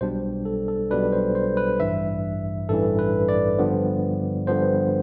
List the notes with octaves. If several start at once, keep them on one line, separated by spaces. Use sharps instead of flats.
B1 B2 G3 D4 C5
A4
A4
B1 B2 G3 D4 B4
C5
C5
B4
A1 G2 E3 E5
A1 G2 E3 A4
B4
D5
G2 D3 F3 B3
G2 D3 F3 B3 C5